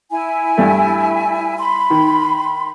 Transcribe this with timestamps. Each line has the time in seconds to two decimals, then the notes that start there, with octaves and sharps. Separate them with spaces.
0.11 E4 G#5
0.58 G2 A3
1.58 B5 C6
1.90 D#3